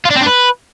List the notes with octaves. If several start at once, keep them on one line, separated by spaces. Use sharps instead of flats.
F4
D4
C4
D4
B4